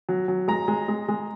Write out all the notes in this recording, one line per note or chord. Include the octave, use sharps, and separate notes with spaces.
F#3
F#3
G#3 A#5
G#3
G#3
G#3